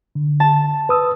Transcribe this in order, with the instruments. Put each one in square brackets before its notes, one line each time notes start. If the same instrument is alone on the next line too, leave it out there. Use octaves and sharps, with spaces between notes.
[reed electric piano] D3
[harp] A5
[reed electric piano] B4 D#6 E6